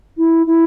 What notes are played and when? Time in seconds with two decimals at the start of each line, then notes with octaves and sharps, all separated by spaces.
0.18 E4
0.46 E4